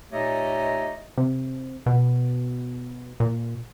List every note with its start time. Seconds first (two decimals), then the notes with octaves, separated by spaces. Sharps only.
0.12 A#2 A3 D#4 G4 C#5 D#5
1.17 C3
1.86 B2
3.20 A#2